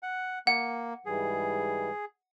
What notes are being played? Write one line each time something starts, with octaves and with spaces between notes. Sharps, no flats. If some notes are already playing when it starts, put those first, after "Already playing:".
F#5
A#3 F#5
G#2 E3 G3 G#4